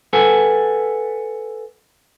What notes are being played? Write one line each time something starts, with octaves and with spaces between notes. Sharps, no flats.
A4 B4 F#5 G#5